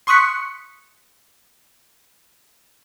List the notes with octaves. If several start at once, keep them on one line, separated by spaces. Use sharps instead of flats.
C6 C#6 D#6 F#6 B6 C#7